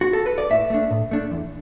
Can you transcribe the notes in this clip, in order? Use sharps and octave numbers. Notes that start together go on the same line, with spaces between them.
F#4
A4
B4
D5
A2 E5
A3 D4
A2
A3 D4
E2